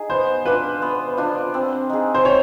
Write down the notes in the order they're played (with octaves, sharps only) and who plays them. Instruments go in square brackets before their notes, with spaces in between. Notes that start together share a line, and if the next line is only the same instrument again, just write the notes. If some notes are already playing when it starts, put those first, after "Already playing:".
Already playing: [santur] D#4 G#4
[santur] B3 [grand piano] C5
[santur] D4 F4 [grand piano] B4
[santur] B3
D4 F4
C4
D#4 G#4
[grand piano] C5
[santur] C4 [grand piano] C#5